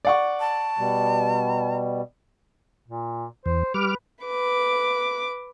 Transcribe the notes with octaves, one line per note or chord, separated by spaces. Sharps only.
D5 F#5 C#6
A5
B2 G3
A#2
E2 C5
G3 B4 D6 F6
B4 D6